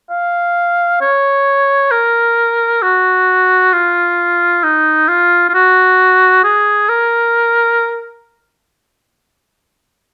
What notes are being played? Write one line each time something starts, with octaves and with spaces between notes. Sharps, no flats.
F5
C#5
A#4
F#4
F4
D#4
F4
F4
F#4
G#4
A#4